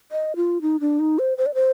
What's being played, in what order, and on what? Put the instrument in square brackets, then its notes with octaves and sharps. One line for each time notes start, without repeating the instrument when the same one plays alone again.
[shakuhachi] D#5
F4
D#4
D4
D#4
C5
C5
D5
C5